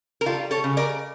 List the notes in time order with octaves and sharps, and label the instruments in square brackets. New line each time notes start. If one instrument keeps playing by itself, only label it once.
[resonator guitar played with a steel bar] A#4
G3 F4 A4
A4 C#5
C#3
A#4 D5